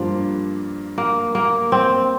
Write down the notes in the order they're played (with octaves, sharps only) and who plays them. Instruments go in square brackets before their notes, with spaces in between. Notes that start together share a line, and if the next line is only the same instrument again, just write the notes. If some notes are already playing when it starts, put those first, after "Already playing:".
Already playing: [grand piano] G2 G3 A#3 D4 [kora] F3
[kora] A#3
A#3
C4